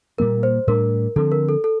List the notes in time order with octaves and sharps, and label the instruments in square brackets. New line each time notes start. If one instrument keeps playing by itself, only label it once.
[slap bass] A#2 G3 A#3 [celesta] A#4
[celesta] C5
[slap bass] A2 G3 D4 [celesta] A#4
[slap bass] D3 F3 C4 [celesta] A4
[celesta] A#4
A4
A4